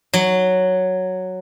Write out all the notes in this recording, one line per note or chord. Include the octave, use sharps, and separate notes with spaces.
F#3